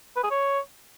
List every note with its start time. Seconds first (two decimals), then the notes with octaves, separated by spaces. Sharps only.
0.17 B4
0.24 G#4
0.31 C#5